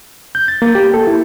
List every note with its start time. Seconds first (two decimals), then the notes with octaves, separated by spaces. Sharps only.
0.35 G6
0.48 A6
0.62 A#3
0.75 G4
0.94 A4
1.07 E4